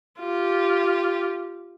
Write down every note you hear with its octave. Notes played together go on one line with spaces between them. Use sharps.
F4 G4